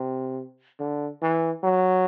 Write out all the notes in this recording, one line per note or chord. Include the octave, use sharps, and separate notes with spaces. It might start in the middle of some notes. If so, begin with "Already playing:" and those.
Already playing: C3
D3
E3
F#3